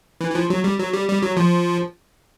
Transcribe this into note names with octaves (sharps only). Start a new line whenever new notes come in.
E3
E3
F3
F#3
G3
F#3
G3
G3
F#3
F3